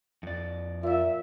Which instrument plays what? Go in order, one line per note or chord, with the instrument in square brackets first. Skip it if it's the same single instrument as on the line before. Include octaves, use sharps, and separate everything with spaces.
[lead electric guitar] F2 D5
[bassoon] A#2 [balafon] F4 F5 [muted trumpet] E5